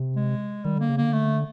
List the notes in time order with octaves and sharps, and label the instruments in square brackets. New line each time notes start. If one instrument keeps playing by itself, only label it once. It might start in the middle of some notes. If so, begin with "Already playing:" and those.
Already playing: [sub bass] C3
[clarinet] G#3
[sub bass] D#3 [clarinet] G3
[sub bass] D3 [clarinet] A#3
[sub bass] C#3
[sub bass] D3 [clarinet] A#3
[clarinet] A3